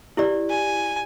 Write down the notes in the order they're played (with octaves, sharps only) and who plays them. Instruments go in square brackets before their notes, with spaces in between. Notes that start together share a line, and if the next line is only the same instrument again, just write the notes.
[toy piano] E4 G4 D5
[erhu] G#5